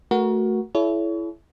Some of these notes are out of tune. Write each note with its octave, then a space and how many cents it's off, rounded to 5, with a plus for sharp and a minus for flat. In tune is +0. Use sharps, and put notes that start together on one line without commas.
A3 +0 F#4 +0 A#4 +25
E4 +15 A4 -45 C#5 +35